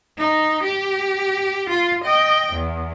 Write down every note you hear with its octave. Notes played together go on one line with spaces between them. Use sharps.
D#4
G4
F4
D#5 G5
E2